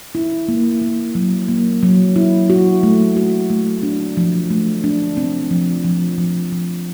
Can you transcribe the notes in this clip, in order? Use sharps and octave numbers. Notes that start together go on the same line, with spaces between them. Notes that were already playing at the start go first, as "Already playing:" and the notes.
E4
A#3
A#3
F#3
A#3
F#3
E4
F#4
A3
F#4
A3
D4
F3
A3
D4
C4
F3
F3
F3
F3